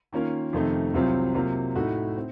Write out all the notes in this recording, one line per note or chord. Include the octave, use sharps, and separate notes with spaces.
D#3 A#3 C#4 F4 A#4
F2 C3 D#3 A3 D#4
C2 C3 F#3 C4 F4
C3 F#3 A#3 F4
A2 A3 D#4 F#4
C4